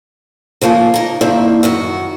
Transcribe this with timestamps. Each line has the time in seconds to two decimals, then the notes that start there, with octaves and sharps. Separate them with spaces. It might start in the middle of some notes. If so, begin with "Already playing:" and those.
0.61 C#3 F3 A#3 F4
0.94 D#4 A#4
1.21 G2 D#3 A#3 C4 E4 E5
1.63 F#2 D#3 F#4